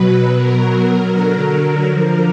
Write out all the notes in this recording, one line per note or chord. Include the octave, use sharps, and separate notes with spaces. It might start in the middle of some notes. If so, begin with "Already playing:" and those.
Already playing: B2 F#3 B4
B2 F#3 A#4
D3 F#3 A#4
A#4
D3 F3 A#4